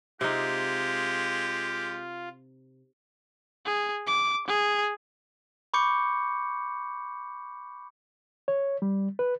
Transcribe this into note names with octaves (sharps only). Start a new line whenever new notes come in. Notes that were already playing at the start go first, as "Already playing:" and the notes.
C3 G#3 D#4 F4 G4
G#4
D6
G#4
B5 C#6 D6 G6 C#7
C#5
G3
B4